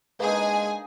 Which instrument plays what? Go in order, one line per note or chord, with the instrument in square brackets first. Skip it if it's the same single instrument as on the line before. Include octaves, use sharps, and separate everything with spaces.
[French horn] G#3 [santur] A#3 D4 D#4 [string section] G#4 G#5 [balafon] B4